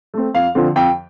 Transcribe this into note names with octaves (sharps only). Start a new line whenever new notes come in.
A3 C4
F2 F5
D3 F3 C4
F2 G5